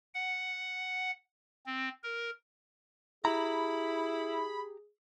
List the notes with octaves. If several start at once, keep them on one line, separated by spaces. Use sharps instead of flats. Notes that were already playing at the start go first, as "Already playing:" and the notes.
F#5
C4
A#4
E4 G4 G#4 A#5 B5